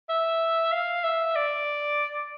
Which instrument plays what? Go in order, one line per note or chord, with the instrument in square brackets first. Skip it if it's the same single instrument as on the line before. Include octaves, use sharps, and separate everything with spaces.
[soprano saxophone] E5
F5
E5
D5